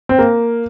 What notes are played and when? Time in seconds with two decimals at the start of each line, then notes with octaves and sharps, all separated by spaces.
0.09 C4
0.19 A#3